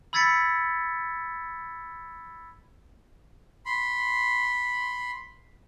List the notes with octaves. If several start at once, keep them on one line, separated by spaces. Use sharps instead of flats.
B5 E6 G#6 A6 B6 C#7
B5 C6